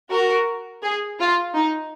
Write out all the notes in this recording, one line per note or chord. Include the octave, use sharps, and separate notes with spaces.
F#4 A#4
G#4
F4
D#4